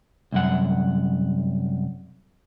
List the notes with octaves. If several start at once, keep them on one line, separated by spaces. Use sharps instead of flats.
C2 F#2 F#5